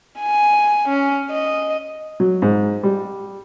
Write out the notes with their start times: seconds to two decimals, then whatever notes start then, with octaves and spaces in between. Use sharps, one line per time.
0.20 G#5
0.89 C#4
1.31 D#5
2.20 F#3
2.42 G#2
2.83 G3